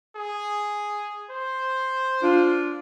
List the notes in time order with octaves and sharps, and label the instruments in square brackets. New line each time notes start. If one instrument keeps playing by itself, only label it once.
[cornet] G#4
C5
[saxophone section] D4 F4